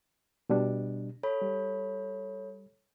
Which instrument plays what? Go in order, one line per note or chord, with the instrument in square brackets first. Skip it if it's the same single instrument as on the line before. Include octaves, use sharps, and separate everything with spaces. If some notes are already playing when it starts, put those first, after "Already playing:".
[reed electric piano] B2 G3 D4
[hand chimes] A4 C#5 B5
[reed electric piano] G3